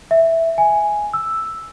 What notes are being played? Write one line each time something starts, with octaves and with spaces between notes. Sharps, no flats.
E5
G#5
E6